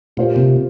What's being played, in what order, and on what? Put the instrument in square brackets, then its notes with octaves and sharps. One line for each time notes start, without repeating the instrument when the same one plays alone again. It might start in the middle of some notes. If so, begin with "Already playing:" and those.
[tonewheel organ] A#2 [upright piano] G3 A#3 F4 C5
[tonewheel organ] C3